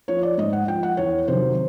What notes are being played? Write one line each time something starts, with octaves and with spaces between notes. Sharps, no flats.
F3 C#5
D5
G#2 D#5
F#5
F3 G5
F#5
E2 C#5
C3 D#3 F#3 C5